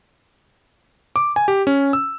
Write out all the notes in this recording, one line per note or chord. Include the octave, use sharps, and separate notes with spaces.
D6
G#5
G4
C#4
E6